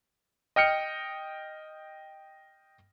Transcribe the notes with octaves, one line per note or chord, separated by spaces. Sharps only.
D#5 G5 F6 C#7